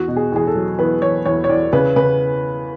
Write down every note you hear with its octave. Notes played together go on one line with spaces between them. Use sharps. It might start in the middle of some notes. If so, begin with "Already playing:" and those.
Already playing: E2 F#4
B2
G#4
E2 G#4
A4
F#3
E2 B4
E2 C#5
E2 C#5
C#5
E2 D5
C#3 B4
C#3 B4